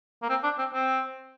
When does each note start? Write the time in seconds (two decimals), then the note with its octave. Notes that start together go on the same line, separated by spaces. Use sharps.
0.23 A#3
0.29 C4
0.44 D4
0.58 C4
0.73 C4